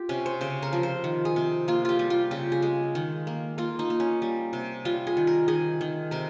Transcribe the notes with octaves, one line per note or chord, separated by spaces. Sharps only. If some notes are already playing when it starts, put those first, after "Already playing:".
Already playing: F4 G4
C3 C#4
C5
C#3 C5
A#4
F3
C5
D#3
G#4
C3
A#3 F4
F4 G4
G3
F4
C#3 G4
G#4
G#3
D#3
A#3
A#3 F4
D#4
A#3
C#4
G3
C3
G3 F4
G#4
D#3
A#4
D#3 G#4
D#3
C3 A#4